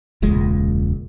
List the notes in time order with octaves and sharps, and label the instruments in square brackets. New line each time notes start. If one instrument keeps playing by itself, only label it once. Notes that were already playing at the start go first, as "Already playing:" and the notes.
[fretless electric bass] E1 C#2 A#2 G#3